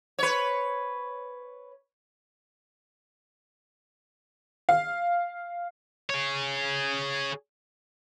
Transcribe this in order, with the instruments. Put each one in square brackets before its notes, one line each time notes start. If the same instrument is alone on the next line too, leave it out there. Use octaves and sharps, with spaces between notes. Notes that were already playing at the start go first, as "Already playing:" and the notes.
[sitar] B4 C#5
[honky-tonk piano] F5
[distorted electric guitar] G#4 C#5